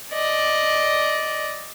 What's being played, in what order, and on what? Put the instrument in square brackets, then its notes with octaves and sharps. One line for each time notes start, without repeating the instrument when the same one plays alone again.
[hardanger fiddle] D5 D#5